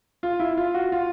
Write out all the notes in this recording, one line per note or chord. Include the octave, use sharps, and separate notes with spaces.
F4
E4
F4
F#4
F4